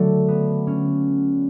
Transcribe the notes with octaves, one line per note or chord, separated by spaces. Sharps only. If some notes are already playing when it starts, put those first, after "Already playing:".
Already playing: D3 F#3 A3
B3
C#4